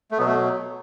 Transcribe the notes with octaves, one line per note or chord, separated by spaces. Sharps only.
A3
B2 F#3 B3
A3